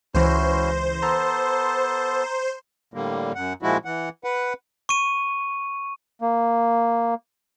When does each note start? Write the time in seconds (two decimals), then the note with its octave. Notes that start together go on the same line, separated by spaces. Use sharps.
0.15 C#2 E3 C#4 E4 F#4 C5 A#6
1.02 B3 A4 A5 A#5 C6
2.94 A2 D3 G3 A#3
3.35 F#2 F#5
3.63 A#2 F3 G#3 E4 F#4
3.85 E3 F#5
4.24 B4 F#5
4.89 C#6 D#7
6.22 A#3